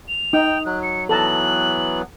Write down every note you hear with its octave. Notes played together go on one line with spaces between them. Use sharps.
F7
D#4 G5
F#3 F#6
C#7
E3 F#3 B3 A4 A5 A#5 F#7